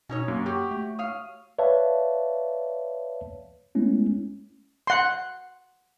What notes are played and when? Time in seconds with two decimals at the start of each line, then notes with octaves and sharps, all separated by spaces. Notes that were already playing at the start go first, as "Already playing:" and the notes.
0.09 B2 C#4 D#4 C#5
0.28 F#2 A#3
0.46 F#4 G4
0.71 A3
0.99 C#5 F5 D#6
1.59 B4 C#5 D5 E5 F5 A5
3.75 G#3 A3 B3 C#4 E4
4.87 F#5 C6